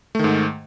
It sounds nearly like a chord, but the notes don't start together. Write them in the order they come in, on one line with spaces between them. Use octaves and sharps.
A3 D#3 G#2